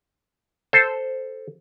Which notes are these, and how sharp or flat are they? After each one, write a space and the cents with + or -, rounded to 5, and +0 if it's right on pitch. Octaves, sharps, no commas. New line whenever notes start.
A4 +0 C5 +0